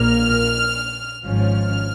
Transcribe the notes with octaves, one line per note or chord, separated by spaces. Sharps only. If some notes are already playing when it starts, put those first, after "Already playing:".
Already playing: A#1 A#2 A#3 F6
G#1 G#2 F3 C#4 F6